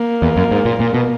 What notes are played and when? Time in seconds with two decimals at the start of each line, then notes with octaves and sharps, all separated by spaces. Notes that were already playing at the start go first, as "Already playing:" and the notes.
Already playing: A#3
0.22 E2
0.37 F#2
0.51 G#2
0.65 A#2
0.80 A#2
0.94 B2